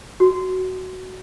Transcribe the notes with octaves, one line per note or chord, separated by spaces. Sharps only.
F#4